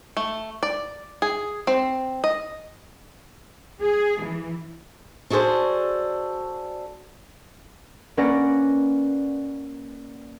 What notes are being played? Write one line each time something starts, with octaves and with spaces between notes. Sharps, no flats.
A3
D5
G#4
C4
D#5
G#4
E3
D4 F#4 G#4 A4 C5
A#3 C#4 B4 D5 F#5 A#6